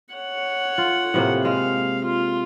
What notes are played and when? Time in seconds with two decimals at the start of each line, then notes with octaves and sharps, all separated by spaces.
0.14 C#5 F#5
0.78 F4
1.14 A2 C3 A#3
1.45 G#3 F5
2.06 F4